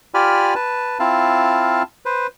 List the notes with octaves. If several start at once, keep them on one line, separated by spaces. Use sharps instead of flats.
F4 G4 D5 G#5 B5 F6
B4 A5
C4 E4 F4 F5 A5
B4 C5